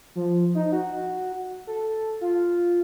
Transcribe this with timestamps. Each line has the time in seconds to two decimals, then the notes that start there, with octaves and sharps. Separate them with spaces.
0.16 F3
0.55 D#4
0.72 F#4
1.67 A4
2.21 F4